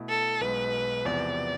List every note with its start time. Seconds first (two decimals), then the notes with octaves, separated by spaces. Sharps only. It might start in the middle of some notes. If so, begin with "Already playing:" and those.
Already playing: B2 A3 E4
0.09 A4
0.40 B1 B2 G#3 B4
1.05 E2 C3 F3 B3 D5